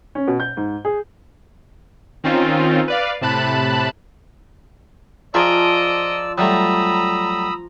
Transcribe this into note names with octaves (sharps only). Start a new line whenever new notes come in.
C#4
B2
G6
G#2
G#4
D#3 C4 C#4 D#4 F4
B4 D5 F5
A2 C3 A5 B5 F#6
F3 G#4 D5 D#5 A#5 E6 D7
F#3 G3 A3 A#5 B5 D#6 E6